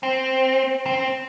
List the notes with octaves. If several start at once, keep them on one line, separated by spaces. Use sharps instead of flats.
C4
C4